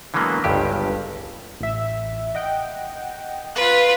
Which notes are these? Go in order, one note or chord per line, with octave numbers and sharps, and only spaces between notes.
D3 E3 F#3 G#3 A#3 B3
G1 C#2 G2 G4
A1 E5
D#5 F#5 G5
F4 B4 F#6